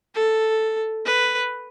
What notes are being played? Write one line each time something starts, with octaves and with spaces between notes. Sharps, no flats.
A4
B4